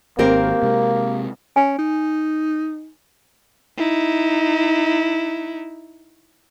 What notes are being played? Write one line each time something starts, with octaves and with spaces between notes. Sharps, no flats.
G#1 A#3 C4 G4 A#4
C3 G#3
C#4 G#5
D#4
D#4 E4